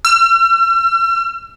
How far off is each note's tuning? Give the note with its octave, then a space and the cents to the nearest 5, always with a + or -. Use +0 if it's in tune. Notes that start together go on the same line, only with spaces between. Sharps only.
E6 +45